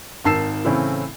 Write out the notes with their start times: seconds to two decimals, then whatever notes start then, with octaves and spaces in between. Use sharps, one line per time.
0.24 G#1 D#3 A5 E6 C7 E7
0.65 A2 C#3 E3 C4 E4